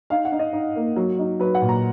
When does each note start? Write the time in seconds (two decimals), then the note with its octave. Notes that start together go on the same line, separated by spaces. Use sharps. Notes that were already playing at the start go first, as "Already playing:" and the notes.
0.10 D#4 F5
0.25 F#5
0.32 D#4
0.39 D#5
0.53 D#4
0.76 A#3
0.96 F#3
1.19 D#4
1.40 F#3 B4
1.55 F#5
1.62 A#2
1.69 A#5